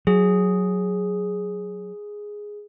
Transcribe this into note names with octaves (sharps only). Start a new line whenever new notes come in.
F#3 G#4